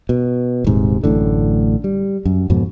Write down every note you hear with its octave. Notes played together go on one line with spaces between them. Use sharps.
B2
D#1 G#2 C3
A1 F#2 A2 D3
G3
F#2
F2 G#2 B2